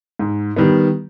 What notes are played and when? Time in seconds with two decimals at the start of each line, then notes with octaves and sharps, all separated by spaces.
0.19 G#2
0.56 D#3 G3 B3